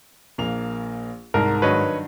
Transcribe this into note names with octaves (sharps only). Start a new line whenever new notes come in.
A#1 A#3 F7
C2 G#2 A#4
G2 D#3 F#3 B4 C#5 D#5